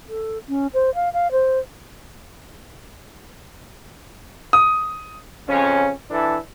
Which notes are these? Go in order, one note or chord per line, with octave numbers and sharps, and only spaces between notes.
A4
C#4
C5
F5
F5
C5
D#6
F2 C#3 C#4
E3 D4 E4 A4